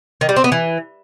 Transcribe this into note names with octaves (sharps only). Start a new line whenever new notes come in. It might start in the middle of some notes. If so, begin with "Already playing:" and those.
D#3
G3
C4
B3
E3